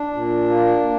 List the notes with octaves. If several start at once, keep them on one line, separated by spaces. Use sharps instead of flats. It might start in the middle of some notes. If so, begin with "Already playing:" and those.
Already playing: D4
A#2
A#3